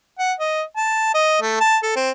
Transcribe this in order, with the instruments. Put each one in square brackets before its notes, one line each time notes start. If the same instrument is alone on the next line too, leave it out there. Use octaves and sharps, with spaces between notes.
[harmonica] F#5
D#5
A5
D#5
A3
A5
A4
C4